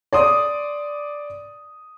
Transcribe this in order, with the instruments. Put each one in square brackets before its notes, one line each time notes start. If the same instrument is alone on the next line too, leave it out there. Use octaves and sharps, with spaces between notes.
[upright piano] D5 C6 D#6